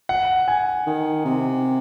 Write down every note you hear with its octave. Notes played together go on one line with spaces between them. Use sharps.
F#5
G#5
D#3
C3